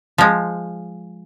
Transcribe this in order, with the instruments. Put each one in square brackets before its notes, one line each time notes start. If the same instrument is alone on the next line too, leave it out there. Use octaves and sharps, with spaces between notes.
[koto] F3 G#3